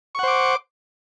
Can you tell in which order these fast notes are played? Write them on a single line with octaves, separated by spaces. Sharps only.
C#6 F#5 C5 D6